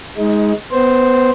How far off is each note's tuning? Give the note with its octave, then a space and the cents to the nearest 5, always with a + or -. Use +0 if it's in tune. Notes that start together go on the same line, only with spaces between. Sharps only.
G#3 +0 D#4 +25
B3 +10 C5 +0